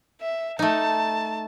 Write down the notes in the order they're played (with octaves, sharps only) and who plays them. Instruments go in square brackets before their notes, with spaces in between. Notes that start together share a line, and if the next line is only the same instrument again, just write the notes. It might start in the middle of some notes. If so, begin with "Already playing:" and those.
[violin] E5
[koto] A3 D#4 [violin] A5